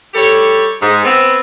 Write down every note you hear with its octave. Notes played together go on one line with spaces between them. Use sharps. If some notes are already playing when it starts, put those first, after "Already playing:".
G3 G4 A4 C#5
G#2
B3 C4